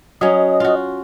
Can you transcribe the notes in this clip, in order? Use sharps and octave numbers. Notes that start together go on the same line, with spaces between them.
F#3 C#4 D#5
F4 F#4